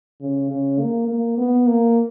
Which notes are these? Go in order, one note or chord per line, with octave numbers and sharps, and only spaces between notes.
C#3
C#3
A#3
A#3
B3
A#3